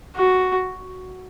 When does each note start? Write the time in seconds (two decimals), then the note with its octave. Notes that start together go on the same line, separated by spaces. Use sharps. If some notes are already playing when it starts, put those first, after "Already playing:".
0.16 F#4